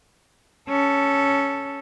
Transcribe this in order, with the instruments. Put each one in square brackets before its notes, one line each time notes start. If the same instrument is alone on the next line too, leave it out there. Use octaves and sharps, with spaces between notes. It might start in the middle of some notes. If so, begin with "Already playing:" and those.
[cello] C#4 A4